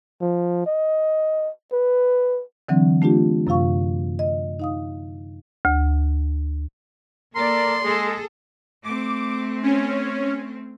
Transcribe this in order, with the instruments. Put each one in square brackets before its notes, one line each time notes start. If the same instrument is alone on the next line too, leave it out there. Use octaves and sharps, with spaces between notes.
[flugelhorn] F3
D#5
B4
[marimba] D3 E3 F#3 C4 D4
A3 D4 F4 G4
F#2 C3 F4 F5 C#6
D#5
D#4 F5 D#6
D2
[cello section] A#3 A4 D5 [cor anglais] A#4 [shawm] C6
[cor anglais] G#3 [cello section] G#4 A4
[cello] A3 C4 [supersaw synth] D6
[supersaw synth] C#4